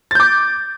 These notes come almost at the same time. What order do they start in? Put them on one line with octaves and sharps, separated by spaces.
A6 G6 D6